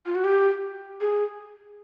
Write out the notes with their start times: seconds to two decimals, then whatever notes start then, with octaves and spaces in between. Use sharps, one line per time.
0.06 F4
0.15 F#4
0.24 G4
1.01 G#4